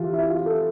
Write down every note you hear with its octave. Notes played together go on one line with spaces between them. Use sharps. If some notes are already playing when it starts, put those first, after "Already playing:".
Already playing: C3 E3 F4
E4
F4
A4